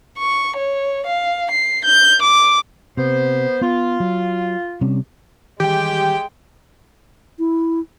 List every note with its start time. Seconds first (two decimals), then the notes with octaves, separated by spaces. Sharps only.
0.18 C#6
0.57 C#5
1.07 F5
1.51 C7
1.85 G6
2.23 D6
2.97 C3 B3 C5
3.61 B3 F4
4.00 F#3
4.81 C3 G3 C#4
5.60 D#3 E3 G3 G#3 G4 G5
7.38 E4